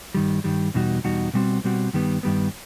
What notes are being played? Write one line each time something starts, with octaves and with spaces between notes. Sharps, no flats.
G2 D#3 G3
G2 D#3 G3
E2 B2 G3 D#4 F#4
E2 B2 G3 D#4 F#4
B2 G3 C4 F#4
B2 G3 C4 F#4
G2 D#3 G3 B3
G2 D#3 G3 B3